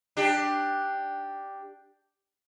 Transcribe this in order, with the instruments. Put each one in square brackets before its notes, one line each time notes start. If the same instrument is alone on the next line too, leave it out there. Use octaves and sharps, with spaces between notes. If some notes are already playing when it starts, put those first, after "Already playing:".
[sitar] D4 G4